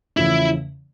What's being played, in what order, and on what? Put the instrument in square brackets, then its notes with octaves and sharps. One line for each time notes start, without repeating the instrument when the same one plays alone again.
[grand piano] E2 C#3 F3 A3 C#4 [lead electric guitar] E4